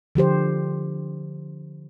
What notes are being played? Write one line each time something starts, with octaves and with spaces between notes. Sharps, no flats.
D3 F3 G4 C5